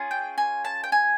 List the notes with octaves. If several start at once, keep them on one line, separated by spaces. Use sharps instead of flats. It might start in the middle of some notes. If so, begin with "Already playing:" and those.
Already playing: C#4 F4 G#4
G5
G#5
A5
G5
G#5